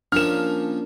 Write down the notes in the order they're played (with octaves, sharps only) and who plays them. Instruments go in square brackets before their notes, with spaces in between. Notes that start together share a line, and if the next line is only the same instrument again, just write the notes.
[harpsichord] F3 A#3 C#4 [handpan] D4 A#4 [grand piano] F6 E7